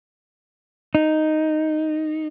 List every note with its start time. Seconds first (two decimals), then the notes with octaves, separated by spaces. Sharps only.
0.95 D#4